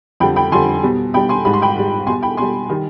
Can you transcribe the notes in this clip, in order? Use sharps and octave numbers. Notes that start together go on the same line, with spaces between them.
F2 D3 G3 G5 B5
G5 B5
F2 D3 G3 G#5 C6
B2 G3
B2 G3 G5 B5
G#5 C6
G#2 G3 B5
C6
G5 B5
G#2 G3
B2 G3 G#5 C6
G5 B5
B2 G3 G#5 C6
D#3 G3